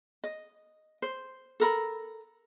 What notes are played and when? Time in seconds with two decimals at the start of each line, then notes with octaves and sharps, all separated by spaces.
0.24 D#5
1.02 C5
1.60 A4 A#4 B5